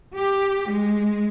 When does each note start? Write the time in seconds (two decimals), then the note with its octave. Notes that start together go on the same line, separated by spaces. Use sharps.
0.15 G4
0.69 G#3